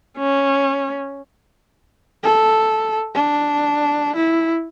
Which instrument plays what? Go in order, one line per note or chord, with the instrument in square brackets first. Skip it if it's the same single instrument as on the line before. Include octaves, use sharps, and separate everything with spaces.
[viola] C#4
[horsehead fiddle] A4
D4
E4